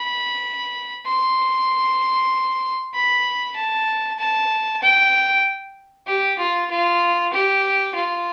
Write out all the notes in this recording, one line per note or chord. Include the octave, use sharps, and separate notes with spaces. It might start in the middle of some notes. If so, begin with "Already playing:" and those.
Already playing: B5
C6
B5
A5
A5
G5
G4
F4
F4
G4
F4